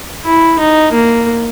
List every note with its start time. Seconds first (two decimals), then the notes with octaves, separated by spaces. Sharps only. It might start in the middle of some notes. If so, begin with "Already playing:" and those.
0.25 E4
0.59 D#4
0.93 A#3